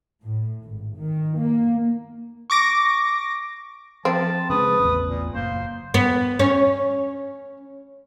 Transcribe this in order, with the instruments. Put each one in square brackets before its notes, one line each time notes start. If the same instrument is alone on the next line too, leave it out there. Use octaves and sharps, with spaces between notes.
[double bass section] A2
G#1
D#3
A#3
[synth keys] C#6 D6 A#6
[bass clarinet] F3 [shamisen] C4 [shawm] A5
[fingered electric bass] C#3 G#3 [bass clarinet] B4 [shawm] D#6
[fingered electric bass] A1 E2
[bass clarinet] A#2
[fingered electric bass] F#1 [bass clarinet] A#3 [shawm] C5
[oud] B3
C#4